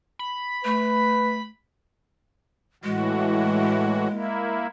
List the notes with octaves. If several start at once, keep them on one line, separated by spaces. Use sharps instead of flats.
B5
A3 B4
A2 E3 G#3 F#4
A#3 E4